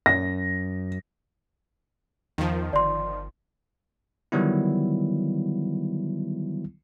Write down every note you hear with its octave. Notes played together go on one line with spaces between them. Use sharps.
F#2 A#6
E2 D#3 F3
G1 D5 C6
D3 D#3 F#3 G3 B3 E4